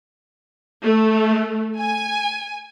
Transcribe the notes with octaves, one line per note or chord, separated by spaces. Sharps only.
A3
G#5